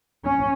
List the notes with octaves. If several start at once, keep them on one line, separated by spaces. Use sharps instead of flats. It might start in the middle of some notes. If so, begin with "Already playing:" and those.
C#4